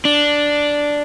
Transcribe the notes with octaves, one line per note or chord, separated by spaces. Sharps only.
D4